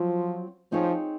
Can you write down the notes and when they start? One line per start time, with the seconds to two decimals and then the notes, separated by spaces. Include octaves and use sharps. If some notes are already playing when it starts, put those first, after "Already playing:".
Already playing: F3 F#3 C4 F4
0.72 F3 C4 D#4 G#4 C#5